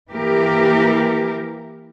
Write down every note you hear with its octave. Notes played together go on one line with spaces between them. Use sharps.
E3 A#3 G4 A#4